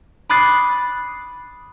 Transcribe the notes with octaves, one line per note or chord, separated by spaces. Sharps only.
B5 D6 D#6 F#6 A6 C7